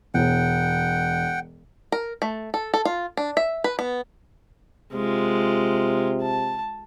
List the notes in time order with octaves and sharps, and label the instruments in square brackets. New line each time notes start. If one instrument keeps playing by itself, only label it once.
[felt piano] E1 [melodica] F#5 G5
[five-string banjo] A#4
A3
A4
A4
F4
D4
E5
B4
B3
[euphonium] C3 [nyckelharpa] G#3 F4
[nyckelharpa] A5